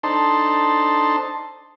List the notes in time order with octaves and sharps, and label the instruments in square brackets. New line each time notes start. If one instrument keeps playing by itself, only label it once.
[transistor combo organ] D4 D#4 A4 C5 A5 C6